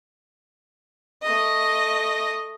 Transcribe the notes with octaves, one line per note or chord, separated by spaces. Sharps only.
A3 D#5